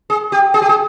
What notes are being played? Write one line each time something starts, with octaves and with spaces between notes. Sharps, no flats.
G#4
G4
G#4
G4
G#4